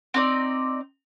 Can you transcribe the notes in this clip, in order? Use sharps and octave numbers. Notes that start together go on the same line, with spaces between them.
C4 D#4 D5